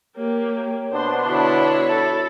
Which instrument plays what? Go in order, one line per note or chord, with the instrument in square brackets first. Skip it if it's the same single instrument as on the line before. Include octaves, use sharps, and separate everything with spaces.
[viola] A#3 G4 [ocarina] C#5
[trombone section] B2 B3 D4 [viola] C5 C6
[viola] D3 [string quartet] E4 C#5 [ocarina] F#4
[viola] A4